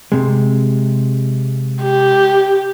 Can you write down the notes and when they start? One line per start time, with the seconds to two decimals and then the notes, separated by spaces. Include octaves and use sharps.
0.12 C3 G#3
1.83 G4